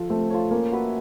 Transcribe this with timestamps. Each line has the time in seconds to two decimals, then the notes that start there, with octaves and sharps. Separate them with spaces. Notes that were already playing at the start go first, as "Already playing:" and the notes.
Already playing: F3 F4 A4
0.10 A3 C4
0.30 F4 A4 C#5
0.51 A#3 C#4
0.72 F#4 B4 E5